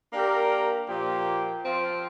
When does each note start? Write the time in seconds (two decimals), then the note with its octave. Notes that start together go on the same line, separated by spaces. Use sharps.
0.12 A#3 D4 G4 A#4
0.88 A#2 F3 A#3 G4
1.64 F3 C4 F4